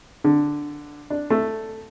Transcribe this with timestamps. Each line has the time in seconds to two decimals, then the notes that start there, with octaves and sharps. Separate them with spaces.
0.24 D3
1.10 D4
1.30 A3